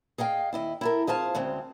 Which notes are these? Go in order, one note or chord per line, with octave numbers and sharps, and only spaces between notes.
G#4 D#5 F5 G5
D#2 E4 D#5
E4 A4 A#4
F2 G#4 C5 F5 A5
D2 C#3 G#3 C4